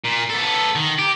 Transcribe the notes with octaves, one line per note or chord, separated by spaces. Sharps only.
A#2
B3 A4
D#3
G4